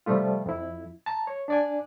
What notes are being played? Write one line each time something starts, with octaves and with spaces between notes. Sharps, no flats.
C3 F3 G3 A3 F4
F2 E4
A5 A#5
C#5
D4 D5 G#5